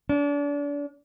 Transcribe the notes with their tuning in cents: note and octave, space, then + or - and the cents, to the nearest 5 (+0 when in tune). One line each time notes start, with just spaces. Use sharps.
D4 -35